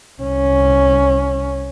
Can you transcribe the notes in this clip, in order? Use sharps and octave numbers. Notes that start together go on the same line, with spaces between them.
C2 C#4